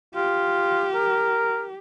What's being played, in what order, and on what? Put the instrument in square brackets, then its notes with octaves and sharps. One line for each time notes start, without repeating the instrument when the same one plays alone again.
[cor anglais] F4 [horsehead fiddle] G4
[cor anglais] A#4